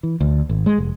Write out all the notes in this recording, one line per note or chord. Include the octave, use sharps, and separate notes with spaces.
E3
D2
G#1
G#3
F1